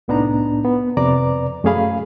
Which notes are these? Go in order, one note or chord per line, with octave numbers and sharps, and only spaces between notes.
C2 A2 B3 D4 D#4 A#5
B3
F2 C3 B4 D5 A#5 D6
F#2 A3 C#4 G#4 F5 B5